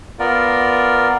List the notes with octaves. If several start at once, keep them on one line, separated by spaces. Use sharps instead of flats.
B3 F4 A#4 D5